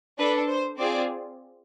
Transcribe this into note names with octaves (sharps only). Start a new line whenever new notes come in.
D4 A4 B4
C5
C4 F4 G#4 D5